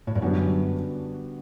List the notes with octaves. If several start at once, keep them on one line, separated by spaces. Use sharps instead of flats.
A2
G2
F#2 D3 G3 B3 D4 F#4